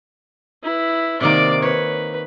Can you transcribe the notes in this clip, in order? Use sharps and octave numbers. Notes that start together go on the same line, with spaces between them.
E4 B4
C3 D#3 A#3 D5 D6
B4 C#5